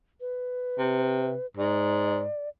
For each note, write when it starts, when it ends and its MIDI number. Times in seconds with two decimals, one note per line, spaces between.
0.21 1.46 71
0.79 1.36 48
1.57 2.27 44
1.57 2.49 74